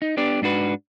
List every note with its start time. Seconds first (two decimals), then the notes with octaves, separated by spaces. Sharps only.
0.02 D#4
0.17 B3 D4 G4 D5
0.42 G#2 D4 F#4 B4